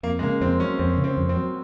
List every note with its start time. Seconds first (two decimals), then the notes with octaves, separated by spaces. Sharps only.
0.03 F2 A#3
0.19 G#3
0.22 C#3 A#3
0.41 F2 C4
0.60 F#3 C#4
0.78 F2 C4
0.97 C#3
1.04 C4
1.17 F2
1.29 C4
1.36 F#3